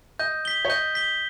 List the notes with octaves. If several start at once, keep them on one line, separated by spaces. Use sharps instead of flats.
D#5 G6
B6 G7
C#5
D#5 G6
B6 G7